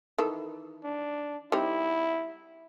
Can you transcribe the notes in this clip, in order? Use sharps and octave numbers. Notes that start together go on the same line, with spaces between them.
D#3 E3 A4
D4
G3 C4 D#4 E4